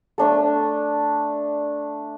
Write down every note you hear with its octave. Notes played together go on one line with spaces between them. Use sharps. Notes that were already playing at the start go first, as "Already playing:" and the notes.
A3 D4 A4